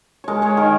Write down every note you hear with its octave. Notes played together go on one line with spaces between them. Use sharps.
G#3 A#4 C#5
G#3 C#5
D#3 A#4